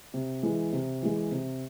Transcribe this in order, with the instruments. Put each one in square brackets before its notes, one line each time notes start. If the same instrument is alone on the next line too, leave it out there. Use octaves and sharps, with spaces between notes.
[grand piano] C3
E3 G#3
C3
E3 G#3
C3